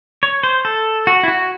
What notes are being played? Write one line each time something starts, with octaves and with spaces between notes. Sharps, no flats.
C#5
C5
A4
F#4
E4
F#4